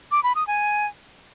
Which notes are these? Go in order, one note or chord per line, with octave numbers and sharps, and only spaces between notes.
D6
B5
D#6
G#5